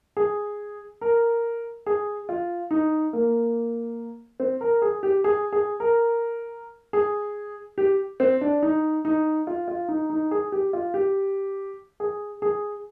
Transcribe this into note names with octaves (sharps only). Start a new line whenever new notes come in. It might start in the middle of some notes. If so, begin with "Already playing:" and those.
G#4
A#4
G#4
F4
D#4
A#3
C4
A#4
G#4
G4
G#4
G#4
A#4
G#4
G4
C4
D4
D#4
D#4
F4
F4
D#4
D#4
G#4
G4
F4
G4
G#4
G#4